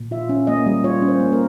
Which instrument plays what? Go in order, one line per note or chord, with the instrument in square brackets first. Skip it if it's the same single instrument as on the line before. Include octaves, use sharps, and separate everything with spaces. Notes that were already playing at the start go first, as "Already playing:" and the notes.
Already playing: [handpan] A#2
F4 E5
C#4
A#3 D#5
G3
F4 C#5
C#4
C5
A#3
A#4